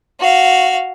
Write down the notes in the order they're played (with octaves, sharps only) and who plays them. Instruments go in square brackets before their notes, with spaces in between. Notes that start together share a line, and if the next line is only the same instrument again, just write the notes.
[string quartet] F#4 F5